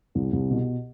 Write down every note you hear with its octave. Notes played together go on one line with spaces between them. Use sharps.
C2
C2
B2